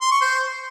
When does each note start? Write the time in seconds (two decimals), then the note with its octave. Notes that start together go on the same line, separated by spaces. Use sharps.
0.01 C6
0.11 C#6
0.21 C5